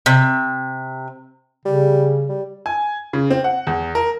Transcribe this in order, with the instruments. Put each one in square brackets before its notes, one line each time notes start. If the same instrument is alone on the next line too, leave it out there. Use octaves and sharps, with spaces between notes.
[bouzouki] C3
[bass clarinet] C#3 [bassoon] G3
[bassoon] G3
[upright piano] G#5
C#3
C4
F#5
E2
A#4